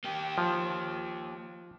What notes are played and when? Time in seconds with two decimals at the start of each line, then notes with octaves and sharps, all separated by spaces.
0.04 A#3 G4
0.38 F3